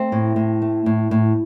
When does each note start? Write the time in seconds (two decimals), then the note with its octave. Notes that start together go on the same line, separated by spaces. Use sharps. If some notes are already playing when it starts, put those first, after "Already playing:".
Already playing: A3 C4
0.12 A2
0.36 A2
0.62 A3
0.86 A2
1.11 A2